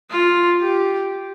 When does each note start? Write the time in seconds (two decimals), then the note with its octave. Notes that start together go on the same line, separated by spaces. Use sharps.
0.10 F4
0.61 G4